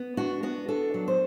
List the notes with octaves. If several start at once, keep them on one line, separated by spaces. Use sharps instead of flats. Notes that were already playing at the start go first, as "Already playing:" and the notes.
Already playing: B3
D4 F#4
B3 F#4
D4 A4
F#3
C5